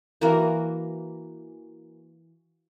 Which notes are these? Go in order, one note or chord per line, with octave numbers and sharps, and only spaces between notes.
E3 A#3 F#4 A#4